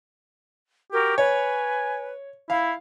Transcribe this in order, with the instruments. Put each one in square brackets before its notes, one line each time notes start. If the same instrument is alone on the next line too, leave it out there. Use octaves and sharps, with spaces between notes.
[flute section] F#4 A#4 [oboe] G4
[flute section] B4 [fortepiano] C#5 [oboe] G#5
[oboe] E4 [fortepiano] F5